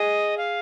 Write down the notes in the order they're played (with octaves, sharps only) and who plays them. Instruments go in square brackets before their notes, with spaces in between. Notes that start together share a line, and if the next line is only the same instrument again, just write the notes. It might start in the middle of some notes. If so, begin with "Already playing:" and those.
Already playing: [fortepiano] G#4 [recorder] D#5
[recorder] F5